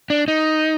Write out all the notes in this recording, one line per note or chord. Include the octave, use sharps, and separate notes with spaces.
D4
D#4